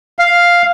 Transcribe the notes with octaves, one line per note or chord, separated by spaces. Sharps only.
F5